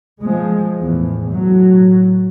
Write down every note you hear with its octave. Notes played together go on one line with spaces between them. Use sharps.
F3 G#3
E2 A2
A2 F#3